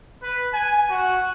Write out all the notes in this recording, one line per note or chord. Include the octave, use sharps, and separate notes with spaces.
B4
G#5
F#4